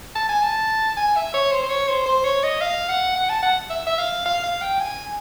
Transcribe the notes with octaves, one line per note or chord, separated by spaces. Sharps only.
A5
G#5
A5
G#5
E5
C#5
C5
C5
C#5
C5
C5
C#5
D#5
F5
F#5
F#5
A5
F#5
E5
E5
F5
F5
F5
G5
G#5